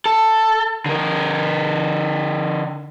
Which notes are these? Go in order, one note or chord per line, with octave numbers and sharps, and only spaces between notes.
A4
D3 A#4